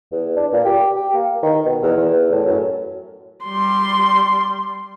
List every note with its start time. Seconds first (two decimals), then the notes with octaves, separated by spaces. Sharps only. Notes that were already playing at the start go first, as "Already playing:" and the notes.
0.12 E2
0.36 D4
0.53 A#2
0.65 G4
0.96 G4
1.14 A#3
1.43 D#3
1.66 B2
1.83 E2
1.97 E2
2.31 A2
2.47 F#2
3.44 G3 C6